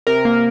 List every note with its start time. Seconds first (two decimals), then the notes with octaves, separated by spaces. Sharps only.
0.07 C3 A#4
0.25 A#3